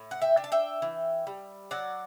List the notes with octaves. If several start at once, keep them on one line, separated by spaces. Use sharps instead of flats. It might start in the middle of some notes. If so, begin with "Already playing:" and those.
Already playing: A2
F#5
E5 G5
D4
A5
E5 G5
E3
G3
F#3 D5 F#5